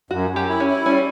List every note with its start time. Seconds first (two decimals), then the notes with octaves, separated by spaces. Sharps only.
0.11 F#2 F#4
0.30 F#2
0.36 G4
0.48 E4
0.60 C#4
0.67 E4
0.86 G3 C#4